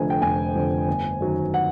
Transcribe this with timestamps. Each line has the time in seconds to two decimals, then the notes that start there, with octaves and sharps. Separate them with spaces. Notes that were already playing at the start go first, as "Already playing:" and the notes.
Already playing: F1 F2 D3 G#5
0.10 G5
0.22 F1 G#5
0.55 F2 D3
0.87 G1
1.20 F#2 D#3 F#3
1.54 F#5